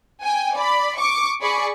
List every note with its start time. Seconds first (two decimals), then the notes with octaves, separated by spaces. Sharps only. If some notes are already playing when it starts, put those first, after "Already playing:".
0.23 G5 G#5
0.55 D5 B5
0.97 C#6 D6
1.41 G#4 D5 B5 C#6